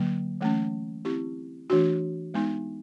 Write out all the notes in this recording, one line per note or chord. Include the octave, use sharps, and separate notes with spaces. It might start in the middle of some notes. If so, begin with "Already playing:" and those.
Already playing: D3 F#3 A#3
E3 A3 C#4
C4 E4 G4
E3 A3 D4 F#4
G#3 B3 D#4